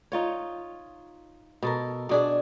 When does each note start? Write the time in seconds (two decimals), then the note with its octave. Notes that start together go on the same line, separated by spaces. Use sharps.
0.12 D#4 F4 C#5
1.62 B2 A4 A#4
2.09 B2 D4 G#4